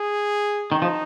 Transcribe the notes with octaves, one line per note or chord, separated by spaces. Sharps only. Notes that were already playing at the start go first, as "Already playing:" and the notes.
Already playing: G#4
D#3 D#4
F3